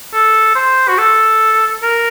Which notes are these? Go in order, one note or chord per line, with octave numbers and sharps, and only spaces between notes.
A4
C5
F#4
A4
A#4